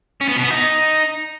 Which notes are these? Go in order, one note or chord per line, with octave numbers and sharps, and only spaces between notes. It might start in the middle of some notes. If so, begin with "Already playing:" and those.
C#4
B3
B2
B3
D#4